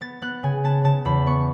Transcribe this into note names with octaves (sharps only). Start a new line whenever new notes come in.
B3 A6
B3 F#6
C#3 G#5
B3 A5
C#3 A5
E2 B5
B3 C#6